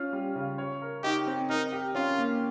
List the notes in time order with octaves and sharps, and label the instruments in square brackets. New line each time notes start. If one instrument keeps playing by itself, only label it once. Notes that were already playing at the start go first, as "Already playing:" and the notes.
Already playing: [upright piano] C#4 F4
G3
C#3
C#5
A#4
[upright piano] D#4 [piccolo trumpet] G4
[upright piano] C4
[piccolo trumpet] D#4 [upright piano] A#4
[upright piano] G4
[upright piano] C#4 [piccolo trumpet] F4
[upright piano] A#3